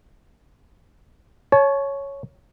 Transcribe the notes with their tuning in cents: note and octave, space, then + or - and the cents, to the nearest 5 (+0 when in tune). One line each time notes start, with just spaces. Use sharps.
C#5 +0 A5 -35